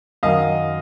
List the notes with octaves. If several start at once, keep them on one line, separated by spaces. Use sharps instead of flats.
F#2 D#3 F#3 D#5 F5